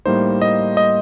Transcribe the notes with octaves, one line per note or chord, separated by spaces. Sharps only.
A2 G3 A#3 D#4 C5
D#5
D#5